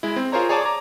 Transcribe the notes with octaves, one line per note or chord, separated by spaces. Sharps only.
G#3 E4
C4
F4 G#4 A#4 C5 C#5 A#5
G#4 C#5 D5 G#5 A5 D6
A#5 D6